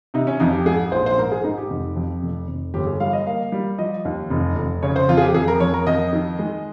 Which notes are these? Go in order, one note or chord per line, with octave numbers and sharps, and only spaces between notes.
C3 D#4
C#4
F2 D#4
G4
G#2 G#4
A#1 C5
C5
G#2 A#4
G#4
G#2 D#4
G4
F1
F2
F1
F1
G1 G4
G#4
G3 F5
D#5
A#3 F5
G3
F3 D#5
D#2
F1
F1
C#3 C#5
C5
F2 F4
G#4
G4
F2 G#4
A#4
F2 C#5
A#4
F2 D#5
D#3
G#3